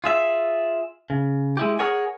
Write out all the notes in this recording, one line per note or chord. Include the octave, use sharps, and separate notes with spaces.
F4 G#4 E5
C#3
G#3 E4 G4
G#4 A#4 C#5 F#5 G#5